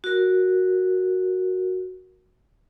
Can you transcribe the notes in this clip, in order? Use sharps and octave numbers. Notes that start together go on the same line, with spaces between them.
F#4 A#4